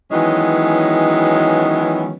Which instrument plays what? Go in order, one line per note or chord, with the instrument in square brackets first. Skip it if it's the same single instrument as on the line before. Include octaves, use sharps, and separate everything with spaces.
[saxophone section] D#3 E3 F#3 G#3 B3 C#4